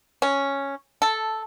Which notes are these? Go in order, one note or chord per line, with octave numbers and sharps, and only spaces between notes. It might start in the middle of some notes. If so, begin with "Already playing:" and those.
C#4
A4